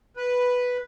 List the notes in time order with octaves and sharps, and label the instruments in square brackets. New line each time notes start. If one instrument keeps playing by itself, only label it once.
[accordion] B4